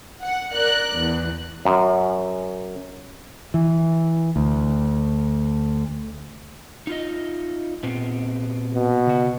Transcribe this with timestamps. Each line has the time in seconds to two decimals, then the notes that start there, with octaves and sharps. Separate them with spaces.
0.22 F#5
0.53 A#4 D5 F#6
0.98 E2
1.65 F#2
3.54 E3
4.36 D2
6.87 D#4 F4 D#5
7.83 A#2 B3 C4
8.75 B2
9.07 C#3 F#4